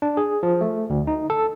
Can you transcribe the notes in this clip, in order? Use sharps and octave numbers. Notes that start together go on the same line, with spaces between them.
D4
G#4
F3
A3
D2
D#4
A4